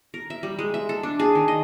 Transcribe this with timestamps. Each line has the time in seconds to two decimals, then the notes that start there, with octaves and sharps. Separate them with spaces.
0.14 A#4
0.30 E5
0.43 G3
0.59 G#3
0.74 E5
0.89 A4
1.03 D4
1.20 G#4
1.35 D#3
1.48 D#5